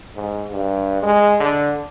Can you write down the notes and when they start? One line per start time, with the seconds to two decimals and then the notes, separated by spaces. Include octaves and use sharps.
0.16 G#2
0.51 G2
1.03 G#3
1.40 D3